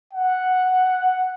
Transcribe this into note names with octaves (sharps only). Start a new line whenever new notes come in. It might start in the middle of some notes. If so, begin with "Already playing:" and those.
F#5